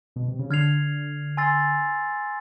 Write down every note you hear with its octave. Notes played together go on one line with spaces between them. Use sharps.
B2
C3
C#3
D3 F6 G#6 C7 F7
G#5 C6 E6 A6 C7